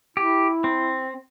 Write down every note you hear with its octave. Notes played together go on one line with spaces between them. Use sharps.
E4 G4
C4